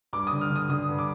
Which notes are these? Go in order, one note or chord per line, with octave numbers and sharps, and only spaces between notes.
G2 D6
D#6
D3
F6
D3
D#6
D3 D#6
G2
D6